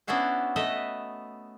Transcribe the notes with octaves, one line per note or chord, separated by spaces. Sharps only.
B3 C#4 D4 E4 F#4 C5
A3 B4 D#5 E5